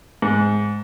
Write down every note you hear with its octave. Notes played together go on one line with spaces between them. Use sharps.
G#2